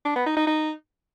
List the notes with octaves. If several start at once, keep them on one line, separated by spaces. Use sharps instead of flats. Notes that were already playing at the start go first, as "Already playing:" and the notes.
D4
B3
D#4
D#4
D#4